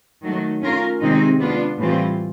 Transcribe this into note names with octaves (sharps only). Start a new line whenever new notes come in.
D#3 F#3 A3
A3 C#4 F4 A#4
C3 D#3 G#3 C4 D#4
B3 D4 F4
A2 E3 G3 C4 F4